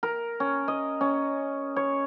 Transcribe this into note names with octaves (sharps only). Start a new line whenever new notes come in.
A#4
C#4
D#5
C#4
C#5